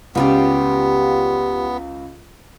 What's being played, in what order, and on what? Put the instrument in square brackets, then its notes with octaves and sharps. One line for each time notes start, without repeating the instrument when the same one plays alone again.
[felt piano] C#2 C#3 [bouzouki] G3 F4 G4 [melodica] B3